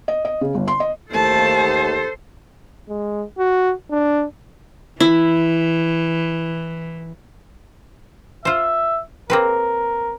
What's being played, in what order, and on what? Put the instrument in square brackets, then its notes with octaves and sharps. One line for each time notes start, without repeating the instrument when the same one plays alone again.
[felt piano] D#5
D#5
C#3
G1
C6
D#5
[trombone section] D#2 [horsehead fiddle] A3 A5 [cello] A4 C5
[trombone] G#3
F#4
D4
[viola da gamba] E3 [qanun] E4
[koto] F4 C5 [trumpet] E5
[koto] A#3 C4 B4 [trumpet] A#4